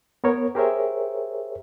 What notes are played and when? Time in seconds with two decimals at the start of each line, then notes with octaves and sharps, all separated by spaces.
0.24 B3 A#4 C#5
0.55 G4 G#4 A#4 C5 C#5 E5